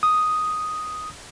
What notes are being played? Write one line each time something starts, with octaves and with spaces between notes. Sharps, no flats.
D#6